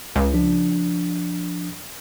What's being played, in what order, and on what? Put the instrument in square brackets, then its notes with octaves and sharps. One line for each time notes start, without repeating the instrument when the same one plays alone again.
[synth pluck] C#2
[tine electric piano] F3 D4